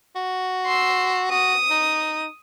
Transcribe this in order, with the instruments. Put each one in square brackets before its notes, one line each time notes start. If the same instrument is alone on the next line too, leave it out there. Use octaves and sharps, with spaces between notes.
[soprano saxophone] F#4
[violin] C6 E6
[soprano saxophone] F#4 [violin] D#6
[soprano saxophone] D#4